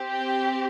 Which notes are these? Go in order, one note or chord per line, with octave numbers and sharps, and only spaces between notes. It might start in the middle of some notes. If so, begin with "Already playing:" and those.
Already playing: C4 G4
G5